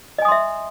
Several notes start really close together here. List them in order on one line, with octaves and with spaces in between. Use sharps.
D#5 G#5 D#6 C6 E5